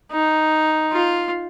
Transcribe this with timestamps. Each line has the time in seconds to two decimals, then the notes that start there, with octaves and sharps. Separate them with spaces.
0.11 D#4
0.92 F4